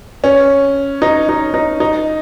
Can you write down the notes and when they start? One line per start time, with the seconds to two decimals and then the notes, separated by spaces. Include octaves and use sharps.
0.24 C#4
1.02 D#4
1.29 D#4
1.54 D#4
1.80 D#4